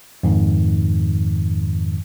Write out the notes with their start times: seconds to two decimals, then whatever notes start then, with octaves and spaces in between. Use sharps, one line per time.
0.23 F2 G#2 D#3